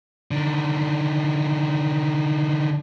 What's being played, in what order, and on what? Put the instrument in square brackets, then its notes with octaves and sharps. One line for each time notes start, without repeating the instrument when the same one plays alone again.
[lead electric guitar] D3 D#3